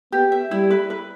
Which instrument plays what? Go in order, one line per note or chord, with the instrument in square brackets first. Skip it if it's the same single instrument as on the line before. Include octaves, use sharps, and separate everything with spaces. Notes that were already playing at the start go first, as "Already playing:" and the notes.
[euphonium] B3 [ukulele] G4
[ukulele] E5
[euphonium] G3 [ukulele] E4
[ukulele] B4
B4